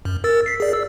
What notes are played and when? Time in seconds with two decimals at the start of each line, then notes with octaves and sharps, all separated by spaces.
0.05 F#2
0.24 A#4 E6 A6
0.46 B6 C7
0.60 G#4 D5
0.73 E6